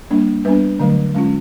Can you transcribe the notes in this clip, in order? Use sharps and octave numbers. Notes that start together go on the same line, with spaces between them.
G3 A#3 D4
G3 B3 D4 B4
D3 F#3 A3
G#3 C#4 F4